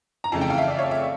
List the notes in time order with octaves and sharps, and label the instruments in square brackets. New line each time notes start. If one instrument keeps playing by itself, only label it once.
[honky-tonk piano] A#5
F2 C#3 E3 A3 A5
G5
F5
E5
D5
C#5
E5